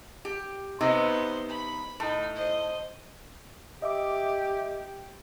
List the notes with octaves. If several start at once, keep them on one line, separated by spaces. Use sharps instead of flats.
G4
C3 B3 D#4 C5
B5
A2 D#4
C5 D#5
G4 D#5 E5 D6